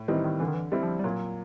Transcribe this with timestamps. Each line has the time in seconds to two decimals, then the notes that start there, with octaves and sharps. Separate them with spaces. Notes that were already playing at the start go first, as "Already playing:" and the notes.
Already playing: A2
0.08 D#3 E3 G3 C4 D#4
0.24 D#3
0.40 D3 E3
0.48 D#3
0.54 E3
0.72 G3 C4 E4
0.83 F3
0.99 G3
1.04 A#2 F#3